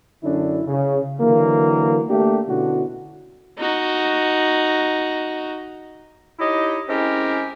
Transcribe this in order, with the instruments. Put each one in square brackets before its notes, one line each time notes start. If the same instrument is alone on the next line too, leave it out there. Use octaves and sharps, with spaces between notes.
[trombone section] F#2 D3 C#4 D4 E4
C#3
D3 E3 F#3 A#3
A3 A#3 D4 G4
B2 D3 C#4 E4 F#4
[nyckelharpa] D#4 F#4
[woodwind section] D#4 E4 G4 C#5 D#5
G#3 C4 C#4 E4 G4 A#4